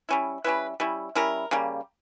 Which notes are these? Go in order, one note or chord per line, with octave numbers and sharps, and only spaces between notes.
G3 C#4 E4
G3 C#4 E4 B4
G3 C#4 E4
G3 C#4 E4 A#4
C#3 G3 A#3